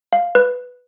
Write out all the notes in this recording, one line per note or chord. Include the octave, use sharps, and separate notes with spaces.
F5
B4